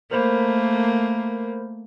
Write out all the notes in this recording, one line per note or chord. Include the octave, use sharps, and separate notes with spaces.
A3 A#3 A#4 C5 B5